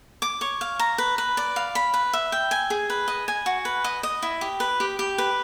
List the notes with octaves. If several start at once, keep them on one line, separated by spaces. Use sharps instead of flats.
D6
C#5
F5
A#5
B4
B4
D5
F5
B5
B4
E5
G5
G#5
G#4
B4
D#5
G#5
F#4
B4
D#5
D#5
E4
G4
B4
G4
G4
B4